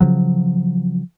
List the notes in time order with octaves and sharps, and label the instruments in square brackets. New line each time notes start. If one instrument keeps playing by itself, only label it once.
[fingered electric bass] C#3 F3 F#3